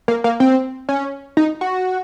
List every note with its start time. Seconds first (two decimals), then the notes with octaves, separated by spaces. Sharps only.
0.08 A#3
0.24 A#3
0.40 C4
0.89 C#4
1.37 D#4
1.61 F#4